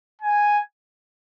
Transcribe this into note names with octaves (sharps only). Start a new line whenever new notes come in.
G#5